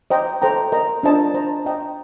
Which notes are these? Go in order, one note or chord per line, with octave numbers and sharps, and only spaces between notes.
C5 D#5 G5 A#5
A4 C5 G5 A#5
A#4 D#5 A#5
D4 F4 C5 D#5 A5
C5 D#5 A#5
C5 D#5 G5 A#5